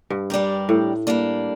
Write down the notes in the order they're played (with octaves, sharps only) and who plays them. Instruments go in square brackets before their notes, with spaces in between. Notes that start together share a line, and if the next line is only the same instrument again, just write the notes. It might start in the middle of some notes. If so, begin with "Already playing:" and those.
[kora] G2
[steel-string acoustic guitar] G3 D4 G4 A#4
[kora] A2
[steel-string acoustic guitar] G3 A#3 D4